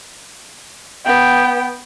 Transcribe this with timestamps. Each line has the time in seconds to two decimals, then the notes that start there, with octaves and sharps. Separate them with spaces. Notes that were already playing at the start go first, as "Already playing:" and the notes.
1.05 B3 G5